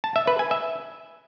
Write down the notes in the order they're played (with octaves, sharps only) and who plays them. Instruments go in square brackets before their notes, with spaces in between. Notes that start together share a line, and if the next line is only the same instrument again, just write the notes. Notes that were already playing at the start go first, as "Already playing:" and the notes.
[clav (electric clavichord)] A5
E5
B4
G#5
E5